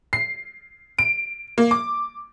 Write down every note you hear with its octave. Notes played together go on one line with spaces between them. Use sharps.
C7
D7
A#3
D6